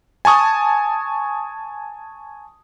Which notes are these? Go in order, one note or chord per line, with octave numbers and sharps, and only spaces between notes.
G#5 A5 C#6 D#6